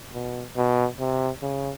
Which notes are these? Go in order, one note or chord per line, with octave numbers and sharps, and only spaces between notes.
B2
B2
C3
C#3